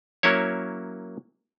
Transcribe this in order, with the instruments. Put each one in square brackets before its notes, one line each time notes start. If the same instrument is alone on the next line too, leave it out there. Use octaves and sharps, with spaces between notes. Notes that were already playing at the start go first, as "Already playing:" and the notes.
[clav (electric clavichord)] F#3 A#3 C#4 E4 C#5